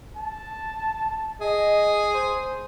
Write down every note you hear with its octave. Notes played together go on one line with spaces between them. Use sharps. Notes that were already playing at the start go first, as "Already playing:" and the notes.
A5
G#4 D#5
C5